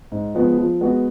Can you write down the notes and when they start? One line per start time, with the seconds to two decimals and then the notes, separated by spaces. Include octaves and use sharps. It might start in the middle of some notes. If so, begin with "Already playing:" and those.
0.12 G#2
0.35 F3 G#3 B3
0.58 F3
0.81 G#3 B3 F#4